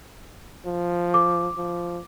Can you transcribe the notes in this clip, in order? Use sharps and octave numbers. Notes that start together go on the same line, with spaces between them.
F3
D6
F3